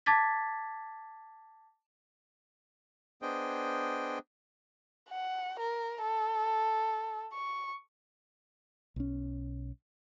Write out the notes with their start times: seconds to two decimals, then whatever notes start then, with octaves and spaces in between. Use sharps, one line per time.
0.06 A5 D6 G#6 A6 B6
3.22 B3 D4 G#4 C5 D#5 G5
5.09 F#5
5.59 A#4
6.02 A4
7.33 C#6
8.96 B1 C#4